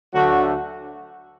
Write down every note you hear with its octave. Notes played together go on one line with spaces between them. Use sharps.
D2 D3 F#3 A3 F#4